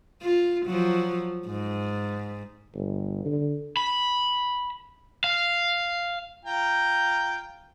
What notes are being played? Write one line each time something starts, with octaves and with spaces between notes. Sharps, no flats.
F4
F3 F#3
G#2
G1
D3
B5
F5
F4 G5 A#5